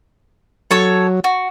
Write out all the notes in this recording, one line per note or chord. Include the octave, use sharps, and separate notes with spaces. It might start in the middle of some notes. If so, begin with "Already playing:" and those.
F#3 A4 C#5
F#4